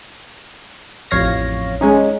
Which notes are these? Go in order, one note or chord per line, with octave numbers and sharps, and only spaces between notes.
A1 F2 C#5 F5 A#6
G#3 C#4 D#4